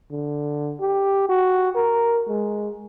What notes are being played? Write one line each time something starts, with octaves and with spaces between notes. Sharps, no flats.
D3
G4
F#4
A#4
G#3